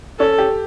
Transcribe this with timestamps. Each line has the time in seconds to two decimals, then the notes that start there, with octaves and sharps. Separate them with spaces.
0.19 C#4 A4
0.38 G4